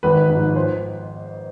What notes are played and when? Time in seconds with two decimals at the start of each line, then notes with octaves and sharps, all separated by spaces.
0.03 G#1 B4
0.29 G#2 F3
0.56 C5